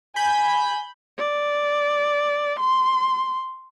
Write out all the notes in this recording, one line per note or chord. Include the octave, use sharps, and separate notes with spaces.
G#5 B5 G6
D5
C6